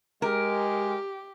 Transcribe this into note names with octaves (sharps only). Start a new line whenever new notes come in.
G#3 G4 A#4